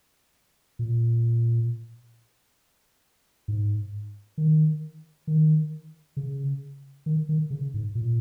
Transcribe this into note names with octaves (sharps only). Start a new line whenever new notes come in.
A#2
G#2
D#3
D#3
C#3
D#3
D#3
C#3
G#2
A#2